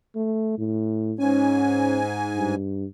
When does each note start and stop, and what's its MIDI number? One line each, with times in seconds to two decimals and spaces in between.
0.16 0.54 57
0.58 1.14 45
1.19 2.55 44
1.19 2.00 61
1.19 2.55 80
2.37 2.86 43